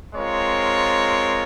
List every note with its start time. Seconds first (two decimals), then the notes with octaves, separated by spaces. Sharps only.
0.15 G#3 C4 F4 A#4 C#5